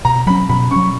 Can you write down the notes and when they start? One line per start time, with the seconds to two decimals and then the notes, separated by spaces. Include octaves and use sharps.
0.05 B2 A#5
0.27 F#3 C#4 B5
0.49 B2 B5
0.71 F#3 C#4 C#6